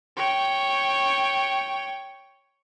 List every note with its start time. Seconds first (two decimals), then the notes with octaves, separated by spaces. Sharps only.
0.16 C#5 G5